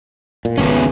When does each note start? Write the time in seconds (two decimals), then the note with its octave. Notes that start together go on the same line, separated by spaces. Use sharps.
0.45 A#2
0.58 G#1 C#2 C#3 B3 C#4